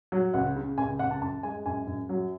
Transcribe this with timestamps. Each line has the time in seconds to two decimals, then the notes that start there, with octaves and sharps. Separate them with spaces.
0.12 F#3
0.34 C#2 F#5
0.56 C#3
0.78 C#2 G#5
0.99 C#2 F#5
1.11 A5
1.22 F#2 A5
1.43 G#3 G#5
1.66 F#2 G#5
1.87 F#2
2.09 F#3